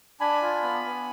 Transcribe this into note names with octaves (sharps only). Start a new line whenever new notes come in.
D4 G#5 B5
F4
B3
B3